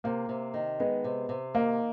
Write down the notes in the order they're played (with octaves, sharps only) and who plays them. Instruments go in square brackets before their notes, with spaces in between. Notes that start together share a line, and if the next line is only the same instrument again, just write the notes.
[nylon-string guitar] C3 [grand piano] A#3
[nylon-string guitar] C3
D#3
[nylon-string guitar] G#3 [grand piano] B3
[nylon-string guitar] C3
C3
[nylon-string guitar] D#3 [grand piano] A#3